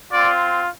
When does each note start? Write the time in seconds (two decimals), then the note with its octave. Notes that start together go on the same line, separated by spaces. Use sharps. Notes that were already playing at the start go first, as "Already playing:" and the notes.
0.11 C4 F4 D5